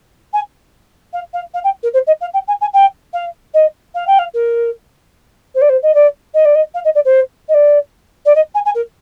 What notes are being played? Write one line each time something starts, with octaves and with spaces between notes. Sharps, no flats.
G#5
F5
F5
F5
G5
A#4
C5
D#5
F5
G5
G#5
G#5
G5
F5
D#5
F5
G5
F5
A#4
C5
D5
C5
D#5
D5
D#5
D5
D#5
F5
D#5
D5
C5
D#5
D5
D5
D#5
G#5
G#5
A#4